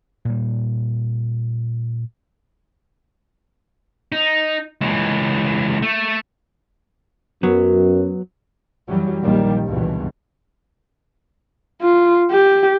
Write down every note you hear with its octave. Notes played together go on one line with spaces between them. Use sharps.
A#2 G3
D#4
C#2 E3
A3
F#2 F#3 B3
F#2 E3 F#3 G3
A#1 D#2 D#3 F3 G3 A#3
C#2 G2 B2 E3
F4
G4